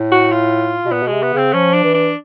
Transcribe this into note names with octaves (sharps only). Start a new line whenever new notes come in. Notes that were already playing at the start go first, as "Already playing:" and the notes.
Already playing: A2
F#4
F4
B2
A#2 B3
B2 G#3
C3
B3
C#3 C4
F3 C#4
D4
E3
D4